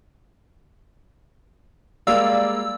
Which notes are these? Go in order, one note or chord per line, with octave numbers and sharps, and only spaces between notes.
G3 G#3 A#3 D5 F5 E6